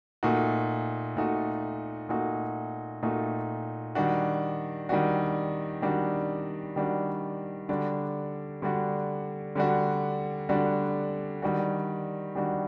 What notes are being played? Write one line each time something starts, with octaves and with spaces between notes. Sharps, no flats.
A#2 A3 D#4 F#4
A#2 A3 D#4 F#4
A#2 A3 D#4 F#4
A#2 A3 D#4 F#4
D#3 G3 D4 F#4
D#3 G3 D4 F#4
D#3 G3 D4 F#4
D#3 G3 D4 F#4
D3 G3 D4 F#4
D3 G3 D4 F#4
D3 G3 D4 F#4
D3 G3 D4 F#4
D#3 G3 D4 F#4
D#3 G3 D4 F#4